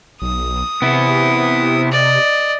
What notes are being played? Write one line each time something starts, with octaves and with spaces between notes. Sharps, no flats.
B1 D#6
C3 B3 E4
D5 D#5